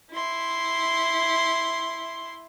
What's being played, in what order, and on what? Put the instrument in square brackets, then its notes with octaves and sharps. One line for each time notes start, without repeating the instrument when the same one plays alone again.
[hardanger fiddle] E4 C6